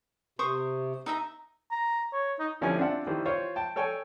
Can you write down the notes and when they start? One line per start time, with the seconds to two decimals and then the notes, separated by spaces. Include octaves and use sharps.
0.39 C3 C5 C#6 D#6
1.06 D#4 E5 A#5
1.71 A#5
2.13 C#5
2.39 D#4
2.61 D3 F3 C#4 E4 G4 G#5
2.78 C4 D4 F4 E5 F#5
3.07 D#3 E3 G3 C5
3.25 F4 C5 C#5
3.56 G5 A5
3.76 A4 C#5 G5 G#5